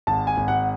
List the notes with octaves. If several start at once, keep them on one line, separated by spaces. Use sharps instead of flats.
G#1 A5
G#5
G#1
F#5